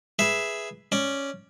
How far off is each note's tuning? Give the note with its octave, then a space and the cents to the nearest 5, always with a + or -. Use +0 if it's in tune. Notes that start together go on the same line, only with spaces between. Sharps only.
G#4 +0 B4 +0 E5 +0
C#4 +0 D5 +0